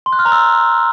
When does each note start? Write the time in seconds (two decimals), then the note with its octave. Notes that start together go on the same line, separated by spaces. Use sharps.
0.06 C6
0.13 F#6
0.19 F6
0.25 A#5
0.32 E6